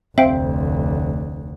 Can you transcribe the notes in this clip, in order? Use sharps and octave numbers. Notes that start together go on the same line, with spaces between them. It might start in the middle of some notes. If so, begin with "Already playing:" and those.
F1 D2 C4 E5 F5 G5